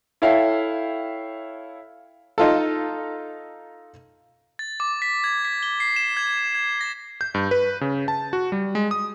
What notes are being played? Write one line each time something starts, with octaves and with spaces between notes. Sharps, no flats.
E4 A4 C#5 E5 F5 G5
D#4 F4 A4
A6
D6
B6
G#6
B6
G7
C7
E7
G#6
G#6
A#6
G6
G2
B4
C#3
A5
F#4
G3
G#3
D#6